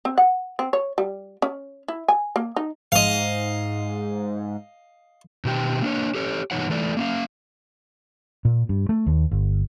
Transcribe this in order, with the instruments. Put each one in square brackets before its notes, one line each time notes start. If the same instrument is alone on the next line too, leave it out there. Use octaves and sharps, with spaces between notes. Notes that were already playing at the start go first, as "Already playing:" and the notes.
[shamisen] C4
F#5
C4
C#5
G3
C#4
E4
G#5
A#3
D#4
[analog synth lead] G#2 [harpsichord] D#5 F5
[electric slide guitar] B2 D#3 G4 G5
A#3 D4 C#5
G4 A4 C#5
G2 B2 E3 D#4 C#5 F#5
E3 A3 A4 D5
A#3 C#4 F5
[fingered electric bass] A#2
G2
A3
D#2
G1